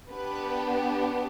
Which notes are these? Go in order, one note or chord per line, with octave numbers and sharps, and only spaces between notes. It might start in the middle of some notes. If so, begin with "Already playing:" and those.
B3 D4 G4 B4